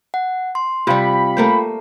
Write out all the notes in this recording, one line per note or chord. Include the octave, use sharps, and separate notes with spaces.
F#5
C6
C3 G3 F4 F5 G5 B5
A3 A#3 C5